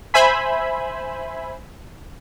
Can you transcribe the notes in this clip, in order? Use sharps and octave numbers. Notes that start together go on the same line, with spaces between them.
C5 E5 G#5 B5